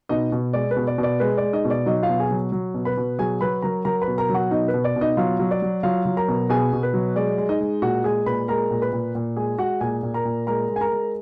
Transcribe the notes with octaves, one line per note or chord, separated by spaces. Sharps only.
B2 D#4 D#5
B2
G#3 D5
B4
B2
D5
B2
D5
G#3 B4
G#3 D5
D#4 D#5
B2
D5
F#3 D#4 D#5
F4 F5
B2
G#4 G#5
F#3
F#3
B2
B4 B5
B2
F#3 G#4 G#5
F#3 B4 B5
F#3 A#4 A#5
F#3 A#4 A#5
B4 B5
B2
A#4 A#5
F#3 F#4 F#5
B2 D#4 D#5
B4
B2
D5
B2
D#4 D#5
F#3 F4 F5
F#3
D5
F#3
F#3 F4 F5
F#3
A#4 A#5
B2
B2 G#4 G#5
B2
B4
F#3
G#3 D5
G#3
D#4 D#5
G#3
A#2 F#4 F#5
G#3 G#4 G#5
A#2 B4 B5
G#3 A#4 A#5
A#2
B4 B5
A#2
A#2
G#3 G#4 G#5
G#3 F#4 F#5
A#2 G#4 G#5
A#2
A#4 A#5
A#2
G#3 A#4 A#5
G#3
G#5
A#4 A#5
G#3